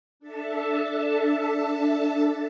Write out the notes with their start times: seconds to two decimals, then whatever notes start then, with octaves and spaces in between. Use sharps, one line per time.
0.19 D4 A4 E5 A5